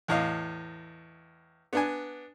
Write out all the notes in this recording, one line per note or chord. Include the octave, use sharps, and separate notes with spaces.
E2 A2 D#5 F5
B3 D4 G#5